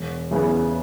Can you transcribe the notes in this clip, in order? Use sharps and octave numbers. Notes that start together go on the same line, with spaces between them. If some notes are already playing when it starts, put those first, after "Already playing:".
Already playing: E1
E2 C#3 E3 B3